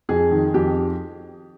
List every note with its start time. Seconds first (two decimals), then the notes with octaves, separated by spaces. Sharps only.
0.09 F2 G#4
0.31 D#3
0.54 F2 G4